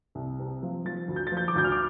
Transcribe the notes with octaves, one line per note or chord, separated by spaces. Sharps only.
C2
C3
F3
F3 A6
D2
G6
A6
F3
G6
D6
D2 G6
F6
D6